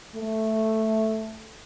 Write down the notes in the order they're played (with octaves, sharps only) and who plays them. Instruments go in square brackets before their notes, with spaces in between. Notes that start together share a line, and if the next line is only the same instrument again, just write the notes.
[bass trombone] A3